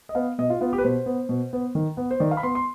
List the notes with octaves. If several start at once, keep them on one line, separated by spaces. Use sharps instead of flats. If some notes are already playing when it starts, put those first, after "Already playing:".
D#5
B3 F5
B2 D#5
F4
B3 F4
G4
B4
B2 C5
B3
B2
B3
D#3
B3
C5
D#3 D5
F5
B5
B3 C6
C6